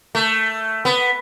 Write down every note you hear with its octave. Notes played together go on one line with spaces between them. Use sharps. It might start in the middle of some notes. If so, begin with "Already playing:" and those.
A3
B3